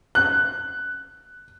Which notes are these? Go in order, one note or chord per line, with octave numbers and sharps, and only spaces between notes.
F#6